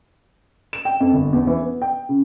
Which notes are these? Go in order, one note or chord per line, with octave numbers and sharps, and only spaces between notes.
E7
G5
F2
G1
E2
E3
B3
G5
C#3